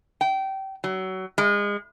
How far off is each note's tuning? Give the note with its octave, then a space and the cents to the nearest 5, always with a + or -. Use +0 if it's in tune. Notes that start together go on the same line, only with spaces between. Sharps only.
G5 -25
F#3 +25
G#3 -30